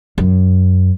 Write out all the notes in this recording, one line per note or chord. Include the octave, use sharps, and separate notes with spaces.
F#2